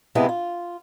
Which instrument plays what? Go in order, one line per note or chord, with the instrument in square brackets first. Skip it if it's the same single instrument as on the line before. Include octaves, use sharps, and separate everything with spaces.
[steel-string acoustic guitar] F2 C3 G#3 B3 E4 G#4
F4